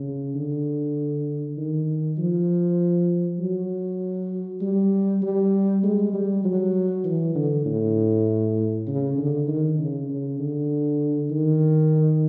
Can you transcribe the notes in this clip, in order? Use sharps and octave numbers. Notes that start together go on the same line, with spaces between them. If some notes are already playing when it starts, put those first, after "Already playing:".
Already playing: C#3
D3
D#3
F3
F#3
G3
G3
G#3
G3
F#3
E3
D3
A2
C#3
D3
D#3
C#3
C#3
D3
D#3